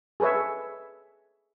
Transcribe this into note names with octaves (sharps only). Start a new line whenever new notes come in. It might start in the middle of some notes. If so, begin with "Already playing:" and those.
G#4 A4 B4 C#5 E5